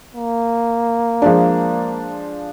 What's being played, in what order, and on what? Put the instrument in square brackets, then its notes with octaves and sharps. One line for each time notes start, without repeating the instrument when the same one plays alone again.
[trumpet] A#3
[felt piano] F3 G#3 D4